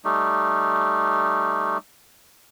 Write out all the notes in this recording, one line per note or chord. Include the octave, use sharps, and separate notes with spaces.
G3 A3 D#4